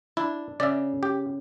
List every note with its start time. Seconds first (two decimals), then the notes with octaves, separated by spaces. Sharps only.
0.17 D4 E4
0.60 C#3 D5 E5
1.03 G4